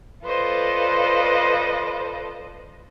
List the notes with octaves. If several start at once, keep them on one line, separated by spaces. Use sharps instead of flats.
F4 A4 B4 C5 D5 D#5